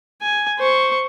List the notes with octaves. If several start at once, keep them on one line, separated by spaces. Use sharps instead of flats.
G#5
C5 C#6